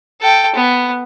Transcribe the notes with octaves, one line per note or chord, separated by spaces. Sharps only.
A4 G5
B3